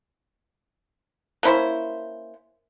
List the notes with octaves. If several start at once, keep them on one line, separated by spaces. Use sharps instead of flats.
A#3 C#4 E4 C5